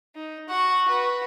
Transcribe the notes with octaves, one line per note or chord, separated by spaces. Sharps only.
D#4
F#4 F#5 C#6
F#4 B4